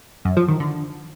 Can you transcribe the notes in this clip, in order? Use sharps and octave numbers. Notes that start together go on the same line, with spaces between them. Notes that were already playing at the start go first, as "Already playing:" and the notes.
F#2
F3
D#3
D3